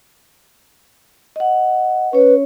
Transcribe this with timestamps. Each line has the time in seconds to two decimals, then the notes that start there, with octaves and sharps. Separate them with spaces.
1.36 D#5 F#5
2.13 C#4 B4 C#5